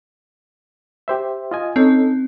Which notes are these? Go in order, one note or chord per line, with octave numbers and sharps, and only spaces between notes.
G4 C5 E5
F4 D#5 G#5
C4 C#4 D#4 A4